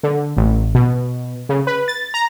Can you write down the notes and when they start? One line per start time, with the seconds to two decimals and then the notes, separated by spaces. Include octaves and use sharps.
0.03 D3
0.37 A1
0.75 B2
1.49 C#3
1.67 B4
1.88 A6
2.14 A#5